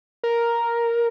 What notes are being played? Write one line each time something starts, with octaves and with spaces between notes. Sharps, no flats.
A#4